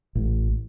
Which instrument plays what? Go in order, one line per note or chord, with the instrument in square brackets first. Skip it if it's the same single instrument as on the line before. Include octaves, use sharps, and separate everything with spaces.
[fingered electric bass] A1